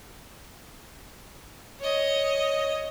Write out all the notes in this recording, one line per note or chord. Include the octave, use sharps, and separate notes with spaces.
C#5 D#5